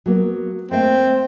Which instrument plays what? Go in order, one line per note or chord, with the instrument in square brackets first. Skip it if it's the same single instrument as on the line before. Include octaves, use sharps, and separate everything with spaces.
[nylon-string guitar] F#3 A#3 B3
[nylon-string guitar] A3 A#3 E5 [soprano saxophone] C4